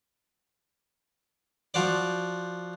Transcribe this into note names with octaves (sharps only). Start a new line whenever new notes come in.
F3 F#4 C5 D5